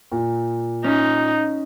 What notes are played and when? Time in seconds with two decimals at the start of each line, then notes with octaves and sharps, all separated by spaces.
0.12 A#2
0.84 C#4 D#4